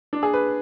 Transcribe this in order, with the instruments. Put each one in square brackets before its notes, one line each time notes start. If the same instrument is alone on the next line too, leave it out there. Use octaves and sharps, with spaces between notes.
[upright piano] D4
G#4
B4